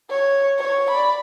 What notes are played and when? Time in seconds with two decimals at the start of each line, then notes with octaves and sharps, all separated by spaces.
0.10 C#5
0.59 C#5
0.91 D5 B5